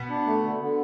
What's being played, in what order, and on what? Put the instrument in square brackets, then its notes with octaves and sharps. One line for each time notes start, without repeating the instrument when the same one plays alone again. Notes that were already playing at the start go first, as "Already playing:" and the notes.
Already playing: [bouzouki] B2 B3
[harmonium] D4
A3
D3
D3